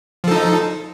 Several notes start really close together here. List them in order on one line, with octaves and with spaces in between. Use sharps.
F3 A4 D#4